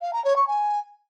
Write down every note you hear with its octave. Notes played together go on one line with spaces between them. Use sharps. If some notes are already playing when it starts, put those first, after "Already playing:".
F5
A#5
C#5
C#6
G#5